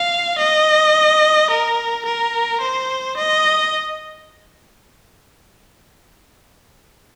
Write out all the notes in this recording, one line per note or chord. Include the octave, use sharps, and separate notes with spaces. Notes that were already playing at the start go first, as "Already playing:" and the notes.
Already playing: F5
D#5
A#4
A#4
C5
D#5